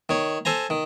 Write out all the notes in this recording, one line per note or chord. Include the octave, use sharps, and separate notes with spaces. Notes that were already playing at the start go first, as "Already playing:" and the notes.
D#3 C#5
A4 C5 G#5 A#5
D#3